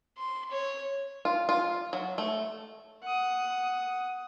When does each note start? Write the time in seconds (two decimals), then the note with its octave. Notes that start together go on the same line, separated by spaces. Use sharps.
0.17 C6
0.51 C#5
1.25 F4
1.49 F4
1.93 F#3
2.18 A3
3.03 F#5 D#6